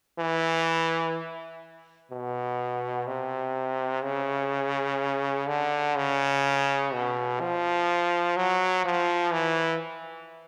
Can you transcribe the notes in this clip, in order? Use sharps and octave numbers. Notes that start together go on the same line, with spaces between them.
E3
B2
C3
C#3
D3
C#3
B2
F3
F#3
F3
E3